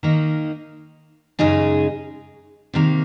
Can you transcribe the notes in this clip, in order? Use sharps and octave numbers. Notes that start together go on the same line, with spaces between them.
D#3 A#3 D#4
F#2 C#3 G#3 D#4 G#4
C3 D#3 A#3